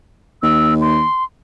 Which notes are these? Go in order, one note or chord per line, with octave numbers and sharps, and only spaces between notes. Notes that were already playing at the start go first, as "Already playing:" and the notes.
D#2 E6
C6